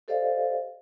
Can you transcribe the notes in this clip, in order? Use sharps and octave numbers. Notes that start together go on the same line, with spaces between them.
G4 A4 C5 D5 D#5 F5